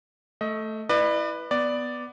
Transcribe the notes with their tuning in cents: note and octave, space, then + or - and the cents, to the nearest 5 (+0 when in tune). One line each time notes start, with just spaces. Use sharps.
A3 +0 D#5 +25
E4 +0 B4 +0 D5 +40
B3 +5 D5 +0